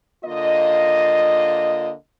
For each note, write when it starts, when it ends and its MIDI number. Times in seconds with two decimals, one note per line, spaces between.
0.25 1.92 50
0.25 1.92 58
0.25 1.92 65
0.25 1.92 75